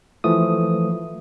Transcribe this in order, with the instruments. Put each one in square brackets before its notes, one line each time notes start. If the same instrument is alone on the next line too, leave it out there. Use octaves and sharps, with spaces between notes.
[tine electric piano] E3 F3 A3 D#6